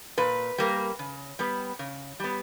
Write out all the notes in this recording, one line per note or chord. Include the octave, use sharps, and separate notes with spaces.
A#2 B4
G3 A#3
C#3
G3 B3
C#3
G3 B3